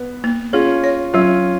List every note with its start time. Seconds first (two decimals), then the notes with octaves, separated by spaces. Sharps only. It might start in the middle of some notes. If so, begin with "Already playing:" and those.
Already playing: B3
0.24 A#3
0.53 C#4 F4 G#4
0.84 C#5
1.14 F#3 C#4 F4